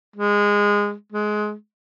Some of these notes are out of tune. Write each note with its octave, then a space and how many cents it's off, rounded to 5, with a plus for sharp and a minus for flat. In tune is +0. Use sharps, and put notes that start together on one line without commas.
G#3 -20
G#3 +20